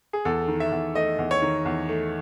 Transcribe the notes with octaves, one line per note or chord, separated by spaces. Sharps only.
G#4
E2 A4
D#3
E5
E2
A3 D#5
E2
C#5
D#3
E2
A3